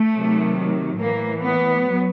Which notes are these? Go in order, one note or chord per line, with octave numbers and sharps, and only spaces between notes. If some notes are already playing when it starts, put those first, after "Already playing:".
Already playing: A3
C3 D#3 F#3
A2 E3 A#3
B3
F#3